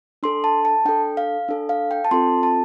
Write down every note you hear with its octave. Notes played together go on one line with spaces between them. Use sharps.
D4 A4 C6
A5
A5
D4 A4 G5
F5
D4 A4
F5
G5
A5
C4 F4 A4 C6
A5